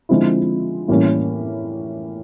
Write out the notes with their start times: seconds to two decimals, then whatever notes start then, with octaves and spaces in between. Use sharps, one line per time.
0.09 D3 F3 G#3 C4 E4
0.88 A2 E3 G3 A#3 C#4